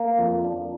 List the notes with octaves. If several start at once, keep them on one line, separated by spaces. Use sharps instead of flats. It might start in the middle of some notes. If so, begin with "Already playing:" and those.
Already playing: A#3
F2
D4